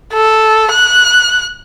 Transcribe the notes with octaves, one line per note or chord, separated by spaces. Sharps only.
A4
F#6